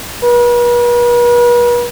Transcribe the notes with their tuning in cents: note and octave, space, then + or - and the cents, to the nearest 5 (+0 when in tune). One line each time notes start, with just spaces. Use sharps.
B4 -45